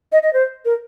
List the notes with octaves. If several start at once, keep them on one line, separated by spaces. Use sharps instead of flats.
D#5
D#5
C5
A#4